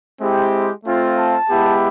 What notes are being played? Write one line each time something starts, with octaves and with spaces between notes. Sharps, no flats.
G#3 C4 E4 G4
A3 C4 F4
A5
G#3 B3 E4 G4